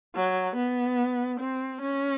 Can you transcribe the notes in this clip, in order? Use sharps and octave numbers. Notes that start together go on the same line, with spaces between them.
F#3
B3
C4
C#4